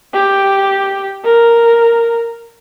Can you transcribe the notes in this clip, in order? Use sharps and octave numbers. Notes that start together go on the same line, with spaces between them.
G4
A#4